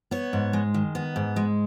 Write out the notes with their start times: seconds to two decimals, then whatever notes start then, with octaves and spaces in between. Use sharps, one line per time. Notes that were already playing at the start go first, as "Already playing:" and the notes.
0.11 B3 C#5
0.33 G#2
0.53 G#3
0.74 D#3
0.95 B3
1.16 G#2
1.36 G#3